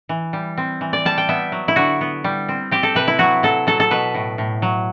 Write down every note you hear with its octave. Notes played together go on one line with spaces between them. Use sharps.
E3
G3
C4
E3
D5
G3 A5
G5
B3 E5
F#3
E4
D3 F#4
B3
G3
C4
C4 G4
A4
C3 B4
E4
F#3 F#4
F#3 A4
F#3 A4
A4
B2 B4
A2
A2
F#3